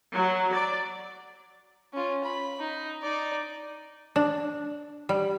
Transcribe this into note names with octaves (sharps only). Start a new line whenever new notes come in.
F#3
D5
C#4 F4
B5
D#4
D#4 D5
D4
G3